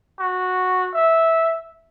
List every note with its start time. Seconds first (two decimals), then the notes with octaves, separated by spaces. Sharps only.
0.20 F#4
0.94 E5